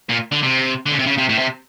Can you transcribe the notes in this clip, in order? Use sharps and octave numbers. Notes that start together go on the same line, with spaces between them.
A#2
D3
C3
D3
C#3
C3
C#3
C3
A2
C3